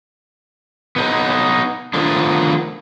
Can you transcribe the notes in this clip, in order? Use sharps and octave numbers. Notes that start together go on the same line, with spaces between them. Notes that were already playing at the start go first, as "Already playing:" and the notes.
B3 D#4 A4
D#3 F3 A3 B3 D4